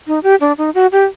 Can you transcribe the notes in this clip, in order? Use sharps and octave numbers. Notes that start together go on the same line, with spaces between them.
D#4
G4
D4
D#4
F#4
G4